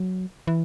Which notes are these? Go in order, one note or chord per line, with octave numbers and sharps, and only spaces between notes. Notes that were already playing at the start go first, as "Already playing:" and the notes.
Already playing: F#3
E3